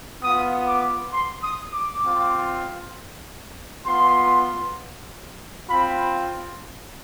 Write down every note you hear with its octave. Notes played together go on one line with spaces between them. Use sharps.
B3 F4 D#6
D6
C6
D#6
D6
C4 F4
B3 F4 C6
C4 F4 B5